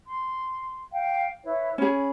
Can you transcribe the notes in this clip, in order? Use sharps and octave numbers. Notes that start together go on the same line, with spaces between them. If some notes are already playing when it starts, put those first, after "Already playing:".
C6
F5 G5
E4 B4 C#5
C#4 G#4 B5